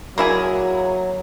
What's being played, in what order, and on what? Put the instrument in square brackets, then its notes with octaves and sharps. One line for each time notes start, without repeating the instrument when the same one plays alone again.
[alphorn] F#3 [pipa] A#3 E4 G#4